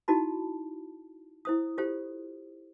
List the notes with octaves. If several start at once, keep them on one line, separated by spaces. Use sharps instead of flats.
D#4 E4 F#4 A5 B5
E4 C5 D#6
F4 G4 A4 C5